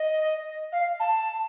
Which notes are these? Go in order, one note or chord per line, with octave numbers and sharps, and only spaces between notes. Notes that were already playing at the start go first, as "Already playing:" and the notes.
Already playing: D#5
F5
A5